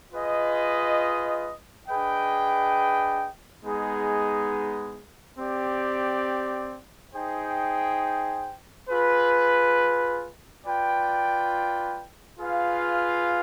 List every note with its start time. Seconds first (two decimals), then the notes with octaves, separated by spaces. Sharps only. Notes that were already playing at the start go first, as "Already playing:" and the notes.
0.13 F4 G#4 B4 D#5
1.89 D4 G#4 B4 D#5 G5
3.64 G#3 B3 D#4 G#4
5.38 C4 G4 D5
7.14 D#4 G#4 C5 G5
8.89 F4 G#4 B4
10.65 F4 B4 D5 G5
12.39 F4 G#4 B4 F5